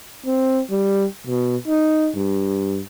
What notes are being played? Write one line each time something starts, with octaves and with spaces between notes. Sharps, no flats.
C4
G3
B2
D#4
G2